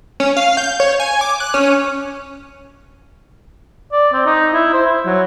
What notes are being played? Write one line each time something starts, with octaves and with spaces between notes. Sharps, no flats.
C#4
F5
G6
C#5
G#5
D6
F#6
C#4
D5
C4
D#4
E4
C5
E4
F#3